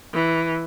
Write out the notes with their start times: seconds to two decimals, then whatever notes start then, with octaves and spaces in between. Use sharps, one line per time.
0.13 E3